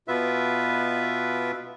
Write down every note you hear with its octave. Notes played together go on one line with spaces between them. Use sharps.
B2 B3 F4 B4 E5